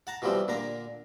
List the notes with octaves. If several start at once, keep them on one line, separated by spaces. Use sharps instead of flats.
F#5 A5 A#5
B2 E3 F3 G3 C4
A#2 D3 A#3 A#5